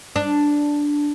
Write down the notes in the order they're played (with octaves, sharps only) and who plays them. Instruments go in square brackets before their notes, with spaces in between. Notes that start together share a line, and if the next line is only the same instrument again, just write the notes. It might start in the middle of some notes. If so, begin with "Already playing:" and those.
[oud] D4